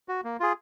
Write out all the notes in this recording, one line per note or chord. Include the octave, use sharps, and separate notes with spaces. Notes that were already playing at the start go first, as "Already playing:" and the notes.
F#4
A#3
F4 G#4